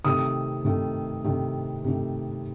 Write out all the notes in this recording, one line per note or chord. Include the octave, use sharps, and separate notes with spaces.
C3 D#3 A3 D#6
C3 D#3 A3
C3 D#3 A3
C3 D#3 A3